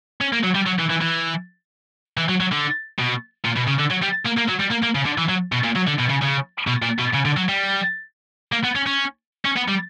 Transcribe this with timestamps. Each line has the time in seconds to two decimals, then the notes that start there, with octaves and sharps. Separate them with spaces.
0.21 C#4
0.33 A#3
0.44 F#3
0.55 G3
0.67 F#3
0.79 E3
0.90 E3
1.01 E3
2.17 E3
2.29 F#3
2.40 F#3
2.52 D3
2.99 B2
3.45 A#2
3.56 B2
3.67 C#3
3.79 D3
3.90 F#3
4.02 G3
4.25 A#3
4.37 A#3
4.48 F#3
4.60 G3
4.71 A#3
4.82 A#3
4.95 C#3
5.05 D3
5.18 E3
5.29 F#3
5.52 B2
5.64 A#2
5.76 F#3
5.87 D3
5.99 B2
6.09 C#3
6.22 C#3
6.67 B2
6.82 A#2
6.99 B2
7.14 C#3
7.25 D3
7.37 F#3
7.49 G3
8.52 A#3
8.64 B3
8.76 C#4
8.86 C#4
9.45 C#4
9.56 B3
9.68 G3